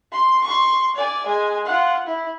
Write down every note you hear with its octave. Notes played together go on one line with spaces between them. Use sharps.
C6
C6 C#6
D5 G#5
G#3 G#5
F4 F#5
E4